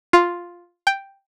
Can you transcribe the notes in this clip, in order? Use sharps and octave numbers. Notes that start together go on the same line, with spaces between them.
F4
G5